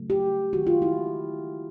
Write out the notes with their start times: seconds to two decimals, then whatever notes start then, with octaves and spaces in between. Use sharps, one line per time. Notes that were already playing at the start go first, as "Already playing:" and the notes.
Already playing: C#3 F#3 A3
0.10 G4
0.53 D#3 G#3 F#4
0.67 F4
0.82 E4